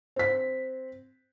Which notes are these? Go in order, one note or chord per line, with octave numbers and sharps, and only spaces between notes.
C4 B6